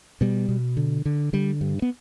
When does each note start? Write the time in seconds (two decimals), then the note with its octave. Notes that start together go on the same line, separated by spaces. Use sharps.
0.21 B2 G3
0.49 B2
0.77 D3
1.05 D3
1.33 D3 G3
1.61 G2
1.82 B3